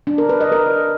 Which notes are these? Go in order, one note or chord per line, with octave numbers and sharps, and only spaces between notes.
D4
A#4
B4
D#5
A#4